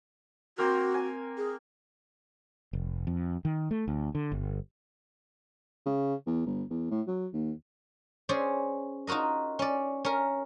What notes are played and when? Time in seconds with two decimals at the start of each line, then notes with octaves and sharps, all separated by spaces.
0.58 A#3 C4 F#4 A#4
0.94 G#5
1.37 G#4
2.73 F1
3.07 F2
3.45 D#3
3.71 A3
3.88 D2
4.15 D3
4.32 G1
5.86 C#3
6.27 E2
6.46 G1
6.71 E2
6.91 A2
7.08 F#3
7.33 D#2
8.29 C#4 G#4 C5 D5
9.07 D#4 F4 F#4 A#4 D#5
9.59 C#4 D5
10.05 C#4 A#4